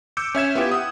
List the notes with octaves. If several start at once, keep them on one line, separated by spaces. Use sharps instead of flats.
D6 E6 G6 C#7
C#4 E5 G#6 E7
B3 E4 F4 G4
F#5 D#6